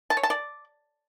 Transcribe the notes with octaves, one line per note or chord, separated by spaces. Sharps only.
A5
C#5
A5
D5